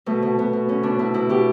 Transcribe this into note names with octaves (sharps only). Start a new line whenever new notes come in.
B2 A3
B2
B2 B3
B2
B2 C#4
B2 D4
B2 E4
B2 E4
B2 G4